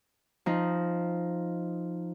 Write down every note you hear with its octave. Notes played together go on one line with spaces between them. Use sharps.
F3 D#4